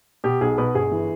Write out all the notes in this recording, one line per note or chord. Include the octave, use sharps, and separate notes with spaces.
B2 G4
B1 G#4
B2 B4
G1 G#4
E3